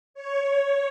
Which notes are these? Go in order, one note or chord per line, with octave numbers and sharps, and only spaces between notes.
C#5